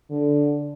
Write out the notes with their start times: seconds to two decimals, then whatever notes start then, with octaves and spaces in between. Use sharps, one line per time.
0.10 D3